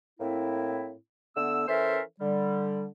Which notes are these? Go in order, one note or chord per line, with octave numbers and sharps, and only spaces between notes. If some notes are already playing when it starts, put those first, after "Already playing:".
A2 A#3 C4 E4
D3 A3 B3 E6
E3 C#4 A4 A#4 C5 E5
D3 G3